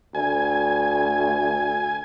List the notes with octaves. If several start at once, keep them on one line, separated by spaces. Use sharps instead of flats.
D2 G#5